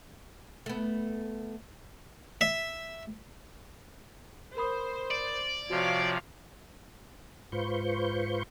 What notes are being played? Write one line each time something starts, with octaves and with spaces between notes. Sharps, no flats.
A3 B3
E5
A#4 C5 B5 D#6
D5
C3 F3 F#4 C#5 F5
G#2 F4 B4 C5 C#6 G6